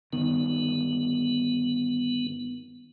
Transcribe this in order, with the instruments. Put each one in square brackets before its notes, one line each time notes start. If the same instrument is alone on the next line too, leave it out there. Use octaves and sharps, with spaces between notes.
[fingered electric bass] G1 D#3 [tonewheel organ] B3